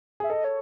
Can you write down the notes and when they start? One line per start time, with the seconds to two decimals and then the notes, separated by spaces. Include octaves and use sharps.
0.20 G#4 E5
0.30 A4 D#5
0.44 C#5